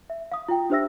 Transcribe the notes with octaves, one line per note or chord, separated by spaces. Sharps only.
E5
F5 D#6
F4 G5
D4 G4 C5 E5 E6 A#6